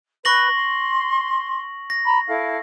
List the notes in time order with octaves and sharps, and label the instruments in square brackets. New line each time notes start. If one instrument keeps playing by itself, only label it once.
[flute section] B4 [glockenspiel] C#6 A#6 F#7
[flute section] C6
[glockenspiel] A#6
[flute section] A#5 B5
E4 A4 F5